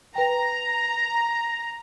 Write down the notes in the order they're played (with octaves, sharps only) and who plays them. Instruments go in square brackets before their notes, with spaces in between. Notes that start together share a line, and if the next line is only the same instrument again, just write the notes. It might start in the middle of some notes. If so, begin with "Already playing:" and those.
[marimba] B4 G5 [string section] A#5